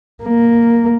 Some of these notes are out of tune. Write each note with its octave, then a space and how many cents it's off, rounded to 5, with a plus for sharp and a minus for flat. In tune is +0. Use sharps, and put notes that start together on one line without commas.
A#3 +0